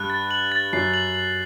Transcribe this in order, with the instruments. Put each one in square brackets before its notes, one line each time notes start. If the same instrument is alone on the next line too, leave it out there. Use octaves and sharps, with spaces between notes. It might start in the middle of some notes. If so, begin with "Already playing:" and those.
Already playing: [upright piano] G2 [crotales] F#6
[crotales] A6
F#7
A6
[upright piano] F#2 [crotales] C7
[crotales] F#7
F#7